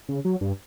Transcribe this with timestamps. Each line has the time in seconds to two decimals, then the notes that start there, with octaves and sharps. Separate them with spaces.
0.09 C#3
0.25 F#3
0.41 G2